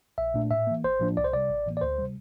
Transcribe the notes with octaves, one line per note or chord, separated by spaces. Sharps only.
A#1 E5
A#2 A3 D4
A2 E5
E3 A#3
A1 C5
A2 F3 A#3 D4
C2 D5
C5
C3 G3 D5
A1
A2 E3 A#3
D5
D2 C5
C3 G3